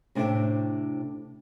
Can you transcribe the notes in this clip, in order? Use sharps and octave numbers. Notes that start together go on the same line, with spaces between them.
A2 C3 D4 E4 C5 G5